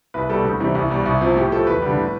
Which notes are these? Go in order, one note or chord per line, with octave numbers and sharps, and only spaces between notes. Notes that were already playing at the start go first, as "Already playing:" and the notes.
C2 B4
B2 G3 A4
D2
C3 E3 G3
C2
B2 G3
C2
C3 F3
A2 G4
F3 A4
E2 B4
D3 G3
A2